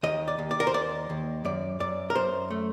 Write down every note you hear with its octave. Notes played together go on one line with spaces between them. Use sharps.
D#2 D#5
D5
D#2
D5
A#4
C5
D#2 D5
D#2
F#2 D5
F#2 D5
A#4
F#2 C5
A3